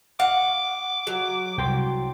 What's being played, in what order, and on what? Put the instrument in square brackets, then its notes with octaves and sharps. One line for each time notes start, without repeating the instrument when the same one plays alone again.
[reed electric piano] F5 [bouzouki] F#5 [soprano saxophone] D6
[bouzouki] F#3
[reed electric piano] C2 G5 C6